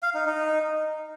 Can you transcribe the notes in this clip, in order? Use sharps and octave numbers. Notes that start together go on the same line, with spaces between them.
F5
D#4
D#4